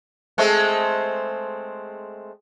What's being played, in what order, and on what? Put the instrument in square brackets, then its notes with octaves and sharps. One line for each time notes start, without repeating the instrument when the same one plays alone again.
[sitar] G#3 A3 C4